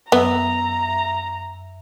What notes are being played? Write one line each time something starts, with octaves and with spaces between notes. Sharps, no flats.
F#2 B3 E5 A#5